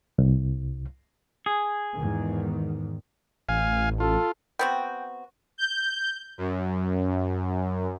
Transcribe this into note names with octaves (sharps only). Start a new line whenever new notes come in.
C2
G#4
E2 G#2 D#3
A1 F5 G#5
F4 A4
B3 C4 F#4 G5
G6
F#2